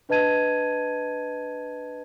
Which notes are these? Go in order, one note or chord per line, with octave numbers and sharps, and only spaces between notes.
D4 B4 D#5 A5 G#6 D#7